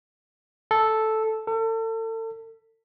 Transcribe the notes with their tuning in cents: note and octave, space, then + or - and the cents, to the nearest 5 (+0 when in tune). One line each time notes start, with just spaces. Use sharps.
A4 -5
A4 +35